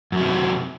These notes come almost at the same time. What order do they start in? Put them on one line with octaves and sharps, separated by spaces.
F#2 F#3 C3